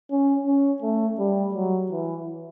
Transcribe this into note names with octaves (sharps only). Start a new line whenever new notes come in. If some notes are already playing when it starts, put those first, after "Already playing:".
C#4
C#4
A3
G3
F#3
E3